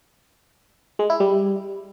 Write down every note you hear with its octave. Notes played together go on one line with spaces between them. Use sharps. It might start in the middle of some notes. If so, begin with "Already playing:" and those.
G#3
E4
G3